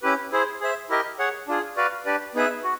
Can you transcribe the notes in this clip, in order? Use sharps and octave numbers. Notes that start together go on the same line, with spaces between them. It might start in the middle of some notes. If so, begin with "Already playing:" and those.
C#4 E4 G4 B4
E4 G#4 C5
G#4 C5 E5
E4 G4 A#4 D#5
G#4 C#5 F#5
D4 F4 G#4
F#4 B4 D5 F5
D4 G4 B4 D5
B3 D#4 G#4 B4 E5
F#4